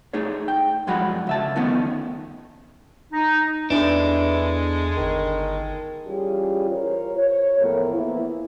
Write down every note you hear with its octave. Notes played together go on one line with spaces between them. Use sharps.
A3 D#4 G#4 C#5
G5
F#2 F3 G#3 F#4 F#5 B5
C#2 E5 A5
D#3 F3 A3 B3 C#4 D#4
D#4
E2 E3 G#3 D4 A4
G1 D#3
E3 G3 C#4 F4 G4 G#4
F4 A#4 C5 C#5
C#5
E2 A2 F3 A#3 A4 A#4
E3 A#3 B3 E4